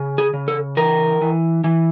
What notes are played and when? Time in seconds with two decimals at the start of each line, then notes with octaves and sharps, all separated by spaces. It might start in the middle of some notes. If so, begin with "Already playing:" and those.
Already playing: C#3
0.18 G#4
0.34 C#3
0.48 A4
0.77 E3 A#4
1.21 E3
1.64 E3